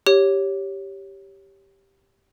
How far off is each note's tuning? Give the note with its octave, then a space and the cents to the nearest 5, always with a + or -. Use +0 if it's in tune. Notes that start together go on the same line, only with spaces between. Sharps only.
G4 +0 C#5 +0